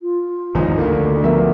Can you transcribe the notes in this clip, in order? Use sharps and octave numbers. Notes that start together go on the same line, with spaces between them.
F4
G#1 E2 C#3 F3 D#4
D2 D3 A#3
F3 B3 A#4 E5